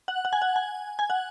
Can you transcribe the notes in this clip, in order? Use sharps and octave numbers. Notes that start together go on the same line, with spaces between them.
F#5
F#5
G#5
F#5
G#5
G#5
F#5